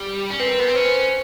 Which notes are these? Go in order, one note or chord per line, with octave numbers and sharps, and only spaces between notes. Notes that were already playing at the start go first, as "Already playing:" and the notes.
Already playing: G3
C#4
C4 B4
A#4
B3 B4
C4
C#4 C5